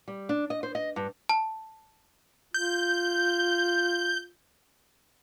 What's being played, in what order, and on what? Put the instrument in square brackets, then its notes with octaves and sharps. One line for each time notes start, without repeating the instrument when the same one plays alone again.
[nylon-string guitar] G3
D4
D#5
C5
D#5
G2
[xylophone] A5
[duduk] F4 [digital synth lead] G6